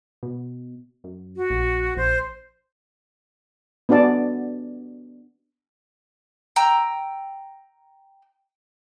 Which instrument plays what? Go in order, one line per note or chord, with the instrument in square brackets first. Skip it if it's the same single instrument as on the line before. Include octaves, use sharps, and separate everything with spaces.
[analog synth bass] B2
F#2
[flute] F#4
[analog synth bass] A#1
[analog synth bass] A#1 [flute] C5
[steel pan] B3 D4 F#4 D5 A5
[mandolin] G5 A#5 E6